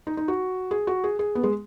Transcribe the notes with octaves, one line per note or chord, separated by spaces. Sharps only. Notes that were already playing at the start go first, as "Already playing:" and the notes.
D#4
D#4
F#4
G#4
F#4
G#4
G#4
B3
G#3